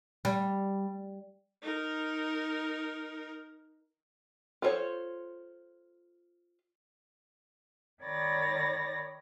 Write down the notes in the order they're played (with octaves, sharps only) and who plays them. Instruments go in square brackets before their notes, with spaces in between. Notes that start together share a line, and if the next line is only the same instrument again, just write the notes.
[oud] G3
[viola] D#4 A#4
[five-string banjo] F4 A4 A#4 C5 C#5
[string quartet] D#3 C#5 D5 B5 A6 A#6